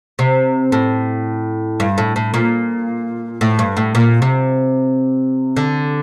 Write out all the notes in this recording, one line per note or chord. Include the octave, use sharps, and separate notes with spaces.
C3
A2
G2
A2
A2
A#2
A2
G2
A2
A#2
C3
D3